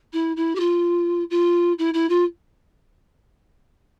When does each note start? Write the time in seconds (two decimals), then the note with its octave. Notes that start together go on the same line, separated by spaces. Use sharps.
0.13 E4
0.36 E4
0.55 G4
0.59 F4
1.30 F4
1.78 E4
1.93 E4
2.09 F4